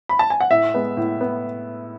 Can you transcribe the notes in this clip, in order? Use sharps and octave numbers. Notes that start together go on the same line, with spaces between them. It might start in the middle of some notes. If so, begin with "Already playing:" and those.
B5
A5
G#5
F#5
A2 E5
G#3 B3
A2
B3